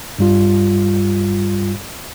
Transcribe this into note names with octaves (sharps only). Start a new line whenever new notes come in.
G2 G3 F4